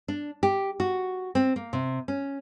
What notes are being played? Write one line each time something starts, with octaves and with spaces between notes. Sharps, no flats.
D4
G4
F#4
C4
A#3
C3
C#4